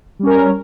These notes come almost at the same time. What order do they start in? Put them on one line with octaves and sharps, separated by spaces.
G3 C#4 A#4